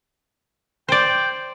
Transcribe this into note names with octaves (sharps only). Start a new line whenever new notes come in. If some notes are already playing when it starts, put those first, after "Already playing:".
C5 D5 G5